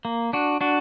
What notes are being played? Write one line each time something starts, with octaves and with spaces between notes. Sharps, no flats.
A#3
D4 F#4
D4 F#4